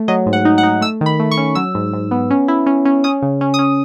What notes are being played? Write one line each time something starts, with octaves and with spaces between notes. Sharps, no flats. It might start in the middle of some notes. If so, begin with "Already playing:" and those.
Already playing: A3
F#3 D#5
G#2
F#5
D#4
F#5
D#4
A3 E6
D#3
B5
A3
C#6
C#4
F#3 E6
G#2
G#2
B3
C#4
E4
C#4
C#4
C#4 D#6
C#3
C#4
D#6
C#4